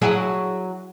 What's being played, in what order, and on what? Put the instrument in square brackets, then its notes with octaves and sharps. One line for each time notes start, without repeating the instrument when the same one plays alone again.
[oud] F#3 E4 G#4